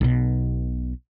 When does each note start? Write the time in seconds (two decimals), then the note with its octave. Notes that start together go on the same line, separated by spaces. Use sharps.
0.01 B1 B2